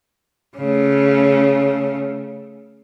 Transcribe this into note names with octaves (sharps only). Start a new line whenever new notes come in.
C#3 A3